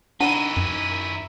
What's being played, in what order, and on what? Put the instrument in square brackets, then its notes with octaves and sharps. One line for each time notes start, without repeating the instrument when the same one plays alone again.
[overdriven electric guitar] D#3 E4 [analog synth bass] D4 [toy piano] F#5 [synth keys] D#7
[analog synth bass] F#2